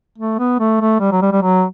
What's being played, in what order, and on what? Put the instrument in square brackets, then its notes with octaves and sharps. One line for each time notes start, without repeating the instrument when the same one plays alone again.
[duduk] A3
B3
A3
A3
G3
F#3
G3
G3
F#3